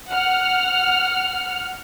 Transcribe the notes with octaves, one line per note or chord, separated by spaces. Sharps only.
F#5 F6